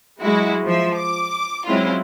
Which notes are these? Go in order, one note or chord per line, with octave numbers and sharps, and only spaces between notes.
F#3 G#3 E4 F#4
F3 E5
D6
F#3 G#3 C4 C#4 E4 F4